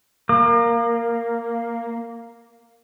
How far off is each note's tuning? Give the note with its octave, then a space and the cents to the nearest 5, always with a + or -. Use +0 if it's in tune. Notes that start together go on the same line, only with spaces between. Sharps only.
A#3 +0 D6 +35